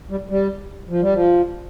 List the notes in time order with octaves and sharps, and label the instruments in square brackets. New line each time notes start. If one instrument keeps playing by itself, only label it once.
[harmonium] G3
G3
F3
G3
F3